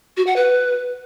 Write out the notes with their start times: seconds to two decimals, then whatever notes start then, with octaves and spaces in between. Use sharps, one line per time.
0.17 F#4
0.27 F#5
0.36 B4